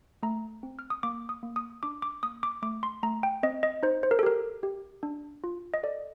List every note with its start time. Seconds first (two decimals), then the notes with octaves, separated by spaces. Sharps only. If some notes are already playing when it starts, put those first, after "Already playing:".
0.23 A3 A#5
0.63 C4
0.79 F6
0.90 D#6
1.03 A#3 D6
1.29 D#6
1.43 A#3
1.56 D#6
1.83 D4 D6
2.02 D6
2.23 A#3 D#6
2.43 D6
2.62 A3 D6
2.83 C6
3.03 A3 A#5
3.23 G5
3.43 C4 D#5
3.63 D#5
3.83 D#4 C5
4.03 C5
4.11 A#4
4.19 A4
4.23 G4 A#4
4.63 G4
5.03 D4
5.44 F4
5.74 D#5
5.83 A4 D5